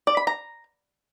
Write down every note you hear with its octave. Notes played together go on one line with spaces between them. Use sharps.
D5
B5
A#5